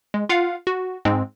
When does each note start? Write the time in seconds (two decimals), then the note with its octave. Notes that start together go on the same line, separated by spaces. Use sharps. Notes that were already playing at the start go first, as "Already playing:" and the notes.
0.14 G#3
0.29 F4 F5 F#5
0.67 F#4
1.05 G#2 G#3 C4